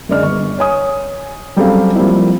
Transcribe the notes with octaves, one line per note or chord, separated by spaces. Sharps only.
F#2 D3 G#3 D5 F6
G1 C#6
C#5 G#5 D#6
F#3 G3 C4 C#4 A4 F5
F3 G3 A#3 C4 E4